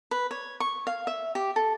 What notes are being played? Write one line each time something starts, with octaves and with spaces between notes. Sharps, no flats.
B4
C#5
C#6
F5
E5
G4
A4